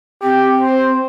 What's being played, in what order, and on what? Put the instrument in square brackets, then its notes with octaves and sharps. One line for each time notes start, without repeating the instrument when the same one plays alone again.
[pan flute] C4 [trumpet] G4
[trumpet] C5